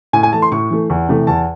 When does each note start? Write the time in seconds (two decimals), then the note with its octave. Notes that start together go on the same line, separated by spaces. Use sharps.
0.13 A2 G#5
0.23 G#5
0.33 E3 A3 A5
0.42 C6
0.52 A2 C#6
0.70 E3 A3
0.90 E2
1.09 C3 E3 A3
1.27 E2 A5